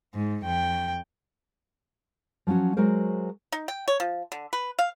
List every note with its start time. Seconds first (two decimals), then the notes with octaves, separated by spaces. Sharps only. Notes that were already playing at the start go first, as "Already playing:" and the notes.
0.14 G#2
0.45 F2 G5
2.47 F3 F#3 C4 C#4 F#4
2.77 F#3 G#3 F#4 A#4 C5
3.52 D#4
3.68 G5
3.88 C#5
4.00 F3
4.32 D3
4.53 B4
4.79 F5